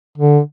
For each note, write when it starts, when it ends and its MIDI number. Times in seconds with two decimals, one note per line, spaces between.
0.17 0.40 50